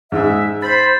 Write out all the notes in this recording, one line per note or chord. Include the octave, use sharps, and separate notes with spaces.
G#2 G#3 E5
C5 B5 A6